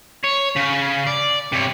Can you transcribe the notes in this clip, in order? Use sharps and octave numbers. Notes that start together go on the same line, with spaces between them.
C#5
C#3
D5
C3 C#5